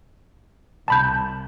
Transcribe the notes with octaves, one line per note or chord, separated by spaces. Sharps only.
C2 A5 B5 G6